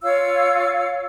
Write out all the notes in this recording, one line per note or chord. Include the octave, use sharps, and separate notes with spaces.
F4 C#5 F5 E6